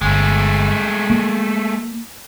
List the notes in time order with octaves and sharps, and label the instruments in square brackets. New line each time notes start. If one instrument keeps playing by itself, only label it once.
[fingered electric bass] G1 [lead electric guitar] G#3 A3
[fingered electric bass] A#3